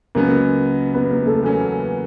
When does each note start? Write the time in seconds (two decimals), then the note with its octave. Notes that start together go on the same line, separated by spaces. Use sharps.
0.15 C#2 C#3 F#3 A#3 B3 A#4
0.94 B3 B4
1.10 A#3 A#4
1.26 A3 A4
1.43 E2 C#3 F#3 A#3 C#4